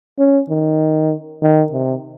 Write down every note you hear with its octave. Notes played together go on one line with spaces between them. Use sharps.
C#4
D#3
D#3
C3